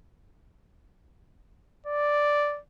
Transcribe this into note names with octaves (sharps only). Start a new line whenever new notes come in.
D5